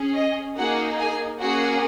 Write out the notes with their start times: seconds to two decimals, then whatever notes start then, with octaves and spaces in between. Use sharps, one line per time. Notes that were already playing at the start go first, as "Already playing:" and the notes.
Already playing: C#4 G#4
0.15 D#5
0.57 A#3 D#4 F#4 G#4 F#5
0.99 G#4 G#5
1.40 A#3 C#4 F#4 G#4 F#5